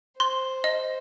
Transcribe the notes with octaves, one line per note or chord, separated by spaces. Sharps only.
C5 C6
D#5